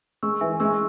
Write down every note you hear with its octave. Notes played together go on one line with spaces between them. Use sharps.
G#3 C#6 E6
E3 E5 G#5
G#3 C#6 E6